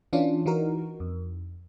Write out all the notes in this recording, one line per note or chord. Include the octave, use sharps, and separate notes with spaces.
E3 C#4 D4 F4
E3 D#4 F#4 A#4
F2